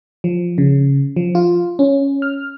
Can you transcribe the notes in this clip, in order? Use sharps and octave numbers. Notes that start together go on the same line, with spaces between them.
F3
C#3
F3
F4
C#4
F6